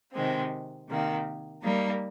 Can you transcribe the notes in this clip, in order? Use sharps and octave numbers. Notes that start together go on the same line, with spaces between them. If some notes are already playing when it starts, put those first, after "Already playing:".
C3 D#3 G#3 C4
C3 D#3 A#3
G3 A#3 D#4